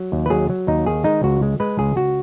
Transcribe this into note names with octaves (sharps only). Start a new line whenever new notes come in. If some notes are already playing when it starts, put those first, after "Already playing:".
Already playing: F#3
D#2
B4
F#3 G#4
F#3
D#2 D#4
D#3 G#4
G#3 D#4
C#2 F#4
G#3
G#3 B4
C#2 G#4
C#2 F#4